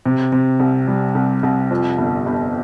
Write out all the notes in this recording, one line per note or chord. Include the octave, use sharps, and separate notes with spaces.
C3
C3
C2
G3
C2
C2
F2
G1
G1